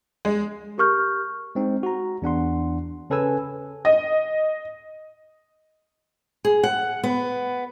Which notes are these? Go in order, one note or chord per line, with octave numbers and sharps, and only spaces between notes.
G#3
G4 A#4 C#6 F6 G6
G#3 C4 D#4
F#4 A#5
E2 D4 F#5 C6
C#3 C#4 A4 B4 G#5 E6
D#5
G#4
F#5
B3